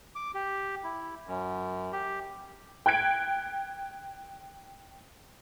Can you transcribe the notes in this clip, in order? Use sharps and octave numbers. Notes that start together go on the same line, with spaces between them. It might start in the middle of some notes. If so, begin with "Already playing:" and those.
D6
G4
E4
F#2
G4
G5 F#6 G#6 D7